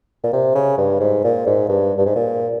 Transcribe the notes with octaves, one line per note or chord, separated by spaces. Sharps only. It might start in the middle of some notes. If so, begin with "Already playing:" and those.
A#2
C3
C#3
G2
G#2
A#2
G#2
G2
G2
G#2
A#2